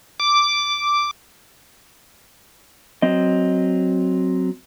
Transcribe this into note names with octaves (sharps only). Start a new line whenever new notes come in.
D6
F#3 C4 D#5